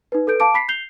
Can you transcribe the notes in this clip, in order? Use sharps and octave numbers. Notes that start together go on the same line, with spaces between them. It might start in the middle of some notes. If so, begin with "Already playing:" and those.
D#4 B4
A4 B4 G6 D7
F5 A5 D6 D7
B5 B6 C7
G6 C7 F7 G7